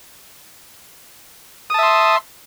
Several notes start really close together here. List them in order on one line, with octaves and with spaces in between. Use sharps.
D#6 A5 E5 C6